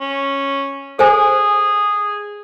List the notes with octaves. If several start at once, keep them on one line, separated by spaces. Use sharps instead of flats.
C#4
G#4 A4 C5 G#5